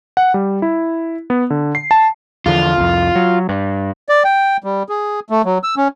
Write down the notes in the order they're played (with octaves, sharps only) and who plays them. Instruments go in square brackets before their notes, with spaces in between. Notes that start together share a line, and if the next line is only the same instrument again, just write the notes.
[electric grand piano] F#5
G3
E4
B3
D3
C7
A5
[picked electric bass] E2 D3 F3 [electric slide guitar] F4
[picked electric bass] C2 F2
F#3
G2
[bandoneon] D5
G5
G3
G#4
A3
F#3
E6
C#4